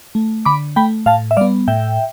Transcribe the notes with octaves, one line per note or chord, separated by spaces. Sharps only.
A3
D3 B5 D6
A3 G5 B5
A2 F5 A5
E5
G3 B3 D5 F5
A2 E5 G5